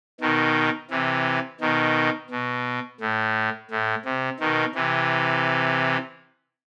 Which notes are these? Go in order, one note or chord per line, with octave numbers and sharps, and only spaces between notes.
B2 D#3
C3 E3
B2 D#3
B2
A2
A2
C3
B2 D#3
C3 E3